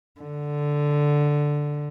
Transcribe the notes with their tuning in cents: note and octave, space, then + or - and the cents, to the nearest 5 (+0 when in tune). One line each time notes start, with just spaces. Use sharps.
D3 +0